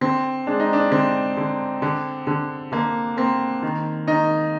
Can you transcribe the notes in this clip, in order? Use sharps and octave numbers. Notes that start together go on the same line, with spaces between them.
D3 C4
G#3 D4
D#4
D4
D3 C4
D3
D3
D3
D3 A#3
A#3 C4
D#3
D#3 D#4